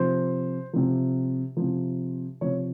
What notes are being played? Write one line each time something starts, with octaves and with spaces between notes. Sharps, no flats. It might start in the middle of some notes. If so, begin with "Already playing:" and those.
Already playing: C3 F3 C5
C3 F3
F3
C3
C3 F3 C#5